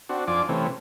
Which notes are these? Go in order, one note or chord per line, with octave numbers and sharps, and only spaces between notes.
C4 D4 F#4
F2 D4 F4 D5 G#5 D6
C3 E3 A3 C4 C#4